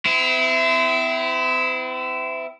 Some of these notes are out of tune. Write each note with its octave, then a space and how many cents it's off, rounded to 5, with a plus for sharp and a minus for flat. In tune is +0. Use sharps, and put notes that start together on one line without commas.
C4 -40 E4 +5